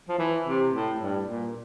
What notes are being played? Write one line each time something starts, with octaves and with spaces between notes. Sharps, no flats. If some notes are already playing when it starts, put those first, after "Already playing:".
F3
E3
C3
A2
G2
A#2